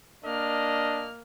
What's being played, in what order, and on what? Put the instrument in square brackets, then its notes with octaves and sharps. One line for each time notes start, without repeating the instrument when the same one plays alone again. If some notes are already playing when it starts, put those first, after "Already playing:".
[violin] A#3 F6 [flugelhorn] D4 [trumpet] D#5